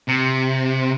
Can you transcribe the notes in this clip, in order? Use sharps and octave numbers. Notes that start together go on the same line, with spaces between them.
C3